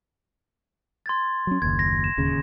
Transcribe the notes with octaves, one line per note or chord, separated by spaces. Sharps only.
C6 G#6 A6
F#3 C#4
F#1 D#2 G#6
A#6
E7
D1 D#2 C#3